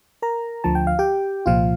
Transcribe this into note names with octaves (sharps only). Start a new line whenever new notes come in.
A#4 A#5
D2 D3 F3 A5
G5
F5
G4 G5
C2 A#2 F3 F4 F5